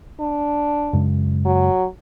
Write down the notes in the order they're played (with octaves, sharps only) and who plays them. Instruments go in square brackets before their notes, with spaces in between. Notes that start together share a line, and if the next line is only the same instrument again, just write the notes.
[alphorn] D4
[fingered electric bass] F#2 C#3 G#3
[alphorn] F#3